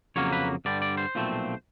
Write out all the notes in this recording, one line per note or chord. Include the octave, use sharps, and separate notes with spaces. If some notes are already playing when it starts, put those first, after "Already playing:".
F2 C#3 F#3 A#3 C#5
B4
G2 D3 G3 D5
D5
C5
B1 A#2 F3 A3 C4